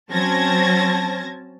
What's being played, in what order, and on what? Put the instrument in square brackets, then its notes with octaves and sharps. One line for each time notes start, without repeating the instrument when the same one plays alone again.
[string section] F#3 C4 C#4 A5 G#6 A#6